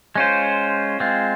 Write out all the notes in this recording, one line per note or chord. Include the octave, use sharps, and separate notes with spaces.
G#3 C#4 F4 C5
G#3 C4 F4